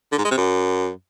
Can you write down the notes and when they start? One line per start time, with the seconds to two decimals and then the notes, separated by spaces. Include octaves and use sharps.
0.12 D3
0.18 G#2
0.25 G#3
0.31 C3
0.37 F#2